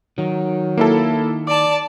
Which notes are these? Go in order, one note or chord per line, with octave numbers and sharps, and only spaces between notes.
D#3 F#3
A#3 E4 A4
D5 A5 D6